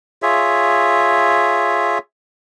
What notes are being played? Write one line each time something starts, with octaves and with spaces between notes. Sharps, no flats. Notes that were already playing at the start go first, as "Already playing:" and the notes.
F4 G#4 C#5 E5